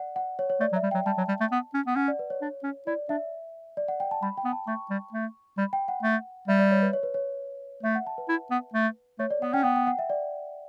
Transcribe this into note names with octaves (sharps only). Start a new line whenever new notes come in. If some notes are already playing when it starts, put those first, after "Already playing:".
Already playing: D5 F#5
F#5
C#5
C#5
A3 D5
F#3
E5
G3
F#3 G5
G3 A5
F#3
G3
A3
B3
C#4
B3
C#4 F#5
D5
B4
C#5
D4
C#4
E4 D5
D4 E5
D5
F#5
G5
A5
G3 B5
G5
B3
A5
A3 C#6
G3
A3
G3 B5
G5
F#5
A3
G3 E5
D5
C#5
B4
C#5
B4
C#5
A3 E5
F#5
A5
B4
E4
B3
A3
A3 C#5
D5
B3 F#5
C#4 G5
B3 G5
G5
F#5
E5
D5